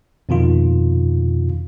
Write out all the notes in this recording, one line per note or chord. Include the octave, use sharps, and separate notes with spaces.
F2 B2 D#3 F4